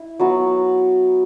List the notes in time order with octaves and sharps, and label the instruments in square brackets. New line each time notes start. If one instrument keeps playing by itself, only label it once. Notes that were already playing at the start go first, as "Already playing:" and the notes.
Already playing: [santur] E4
F#3 B3 F#4